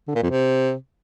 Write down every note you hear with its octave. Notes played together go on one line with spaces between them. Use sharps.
D3
A#2
F2
C3